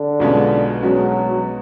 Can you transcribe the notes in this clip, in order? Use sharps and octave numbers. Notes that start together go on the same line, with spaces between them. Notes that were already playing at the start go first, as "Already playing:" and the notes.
Already playing: D3
B1 B2 G#3 C#4 F4
B2 F#3 G#3 C#4 F#4